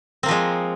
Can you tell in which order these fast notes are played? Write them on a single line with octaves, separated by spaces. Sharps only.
C4 A#3 F3 G#3